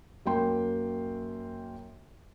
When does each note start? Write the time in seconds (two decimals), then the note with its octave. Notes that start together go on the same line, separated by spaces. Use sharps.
0.26 F#2 A#3 G5 C6